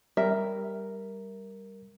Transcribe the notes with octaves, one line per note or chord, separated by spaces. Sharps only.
G3 A#4 E5